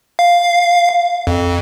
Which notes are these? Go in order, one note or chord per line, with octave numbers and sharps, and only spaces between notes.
F5
F2